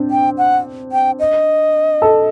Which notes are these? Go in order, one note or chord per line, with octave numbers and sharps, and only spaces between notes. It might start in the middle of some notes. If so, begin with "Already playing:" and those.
Already playing: C4 D4
G5
F#5
G5
D#5
A4